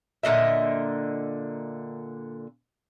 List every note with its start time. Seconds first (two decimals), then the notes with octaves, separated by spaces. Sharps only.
0.23 A#2 D3 D#5 E5